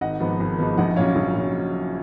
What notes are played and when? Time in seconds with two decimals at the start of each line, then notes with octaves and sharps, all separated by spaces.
0.01 G#1 D#5 F#5
0.20 G#2 F3 B3
0.40 G#1
0.58 G#2 F3 B3
0.78 A#1 D#5 F#5
0.96 A#2 F#3 C#4 C#5 F5
1.16 A#1
1.35 A#2 F#3 C#4